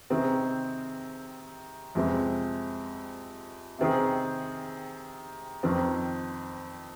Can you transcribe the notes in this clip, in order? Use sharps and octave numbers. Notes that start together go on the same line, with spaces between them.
C3 D#3 C4 G#4
F2 C3 G#3 C4
C3 D#3 C4 G#4
F2 D#3 C4